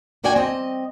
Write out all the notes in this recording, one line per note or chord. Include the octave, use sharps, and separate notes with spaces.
A#2 D4 F#4 D5 G5 G#5
C4 D#5